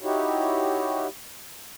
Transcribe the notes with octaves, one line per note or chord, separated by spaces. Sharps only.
D#4 E4 F#4 G4 C#5